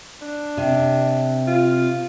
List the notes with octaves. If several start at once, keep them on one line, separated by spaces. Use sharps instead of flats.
D4
C3
F4